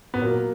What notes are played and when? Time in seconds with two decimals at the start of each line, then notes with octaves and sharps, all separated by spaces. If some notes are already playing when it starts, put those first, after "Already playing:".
0.14 G#2 B3
0.22 A#2 F#3 A#3